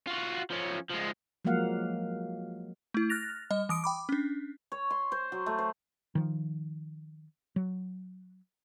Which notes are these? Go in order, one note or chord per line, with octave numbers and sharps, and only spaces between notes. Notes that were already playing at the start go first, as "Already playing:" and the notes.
F4 F#4
F3 C#4
F3 G#3
F3 F#3 G#3 A#3 F5 F#5
A3 E4
F6 F#6 A6 A#6 F7
G3 D#5
E3 D#6 D7
G5 B5 D6
C#4 D4
C#5
C6
C5
F#3
A3
C5
D#3 F3
F#3